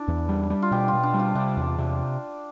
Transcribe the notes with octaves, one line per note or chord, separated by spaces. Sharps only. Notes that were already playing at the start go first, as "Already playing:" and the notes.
Already playing: D4 E4
E2
G3
G3
F4
B2 G4
F4
B2
D4
G3
F4
C3 D4
E2
C3